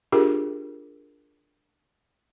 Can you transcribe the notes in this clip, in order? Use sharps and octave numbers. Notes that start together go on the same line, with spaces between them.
D4 F4 G4 G#4 A#4